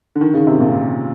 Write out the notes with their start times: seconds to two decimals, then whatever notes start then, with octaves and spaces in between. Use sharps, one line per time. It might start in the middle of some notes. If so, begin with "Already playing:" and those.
0.15 D3
0.21 D#3
0.34 C#3
0.47 C3
0.60 A#2